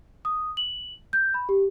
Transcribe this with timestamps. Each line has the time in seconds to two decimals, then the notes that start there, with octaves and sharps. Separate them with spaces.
0.25 D#6
0.57 F#7
1.13 G6
1.34 B5
1.49 G4